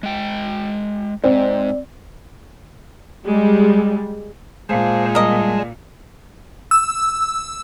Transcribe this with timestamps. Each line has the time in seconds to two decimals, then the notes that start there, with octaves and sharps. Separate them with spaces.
0.03 G#3 G5
1.24 G#2 C4 D5
3.25 G3 G#3
4.69 A#2 G#3 C5 F5 A5
5.15 G3 A#4 D#5 A5
6.71 E6